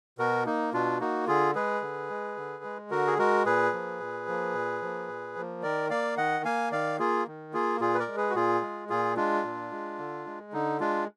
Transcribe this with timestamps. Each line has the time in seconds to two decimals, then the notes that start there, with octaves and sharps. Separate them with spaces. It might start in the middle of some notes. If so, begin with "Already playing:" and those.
0.18 B2 F#4 A#4
0.46 A#3 D#4
0.73 B2 D4 F4
1.00 A#3 D#4 F#4
1.27 D3 F4 G#4
1.55 G#3 G#4 B4
1.82 D3
2.10 G#3
2.37 D3
2.64 G#3
2.91 D3 F#4 A#4
3.07 G#4
3.18 G#3 F#4 A#4
3.45 A#2 G#4 B4
3.73 F3 A#3
4.00 A#2
4.28 F3 A#3
4.54 A#2
4.82 F3 A#3
5.08 A#2
5.36 F3 A#3
5.63 D#3 A#4 D5
5.90 A#3 D5 F5
6.17 D#3 D#5 F#5
6.45 A#3 F5 G#5
6.71 D#3 D5 F5
6.99 A#3 F4 G#4
7.27 D#3
7.53 A#3 F4 G#4
7.80 A#2 F4 G#4
7.94 B4
7.99 A#4 D5
8.08 G#3
8.17 G#4 B4
8.30 F#4
8.35 A#2 F4 G#4
8.62 G#3
8.89 A#2 F4 G#4
9.17 G#3 D4 F4
9.44 A#2
9.72 G#3
9.98 D3
10.27 G#3
10.53 D3 D#4
10.80 G#3 D4 F4